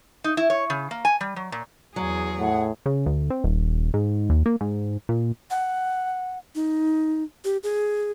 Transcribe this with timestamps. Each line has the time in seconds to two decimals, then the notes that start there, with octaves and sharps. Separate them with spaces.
0.24 D#4
0.37 E4
0.50 C#5
0.70 C#3
0.91 A#3
1.05 G#5
1.21 G3
1.36 F#3
1.52 A#2
1.96 E2 F#3 G#4
2.39 A2 F#5
2.86 C#3
3.06 D2
3.30 C4
3.44 D#1
3.94 G#2
4.30 D#2
4.46 A#3
4.61 G#2
5.09 A#2
5.51 F#5
6.55 D#4
7.45 G4
7.63 G#4